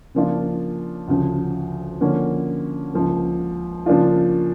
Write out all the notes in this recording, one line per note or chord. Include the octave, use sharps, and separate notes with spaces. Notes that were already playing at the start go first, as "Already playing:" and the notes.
C#3 F3 A#3 D4 F4
D2 C#3 F3
D3 F3 A#3 C#4
C#2 C#3 F3 A#3
C#3 F3 A#3 D4 F4